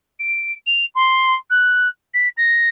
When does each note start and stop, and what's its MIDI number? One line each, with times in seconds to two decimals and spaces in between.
0.19 0.52 98
0.66 0.85 101
0.95 1.35 84
1.50 1.88 90
2.14 2.28 95
2.37 2.69 94